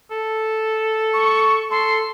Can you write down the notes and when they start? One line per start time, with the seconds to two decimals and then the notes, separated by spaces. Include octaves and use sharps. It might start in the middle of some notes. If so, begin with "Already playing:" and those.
0.11 A4
1.13 C#6
1.71 A4 C6